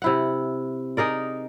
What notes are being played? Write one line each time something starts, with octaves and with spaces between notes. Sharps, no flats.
C3 E4 F#5
D#4 G#4 A#4 D5